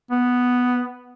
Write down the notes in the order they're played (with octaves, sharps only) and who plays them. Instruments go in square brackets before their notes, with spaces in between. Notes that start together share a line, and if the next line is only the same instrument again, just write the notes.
[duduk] B3